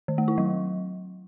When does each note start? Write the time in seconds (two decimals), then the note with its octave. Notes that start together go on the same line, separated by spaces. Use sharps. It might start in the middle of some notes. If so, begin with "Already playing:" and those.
0.08 D#3
0.18 A3
0.28 E4
0.38 F#3